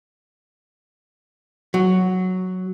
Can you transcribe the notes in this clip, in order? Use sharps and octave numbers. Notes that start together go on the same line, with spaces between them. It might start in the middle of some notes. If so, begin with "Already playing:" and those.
F#3